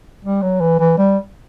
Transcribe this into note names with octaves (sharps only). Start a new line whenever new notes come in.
G3
F#3
E3
E3
G3